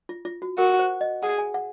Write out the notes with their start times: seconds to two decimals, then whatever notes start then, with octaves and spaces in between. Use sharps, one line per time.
0.09 F4
0.25 F4
0.42 F#4
0.58 F#4 A#4
0.79 C5
1.01 D#5
1.23 G#4 F#5
1.38 G#5
1.54 F#5